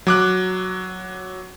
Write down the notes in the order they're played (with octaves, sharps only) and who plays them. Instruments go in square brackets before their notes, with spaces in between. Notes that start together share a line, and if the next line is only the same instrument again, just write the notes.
[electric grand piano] F#3 D6 F#6